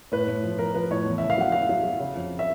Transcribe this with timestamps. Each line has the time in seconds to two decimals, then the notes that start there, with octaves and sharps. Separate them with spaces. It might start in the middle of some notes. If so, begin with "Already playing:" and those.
0.12 A2 B4
0.28 A2
0.44 F3
0.58 F3 A#4
0.74 F3 B4
0.91 A2 C#5
1.06 E2
1.18 C#3 E5
1.30 F5
1.38 F#3 F#5
1.52 F#3 F5
1.69 F#3
1.83 F#3
2.00 C#3
2.16 F2
2.39 E5